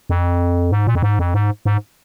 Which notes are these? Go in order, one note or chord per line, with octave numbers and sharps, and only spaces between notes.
F2
G#2
A#2
F2
G#2
F2
G#2
G#2